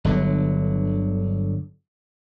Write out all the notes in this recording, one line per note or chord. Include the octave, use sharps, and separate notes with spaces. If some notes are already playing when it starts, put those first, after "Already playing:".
G1 D3 F#3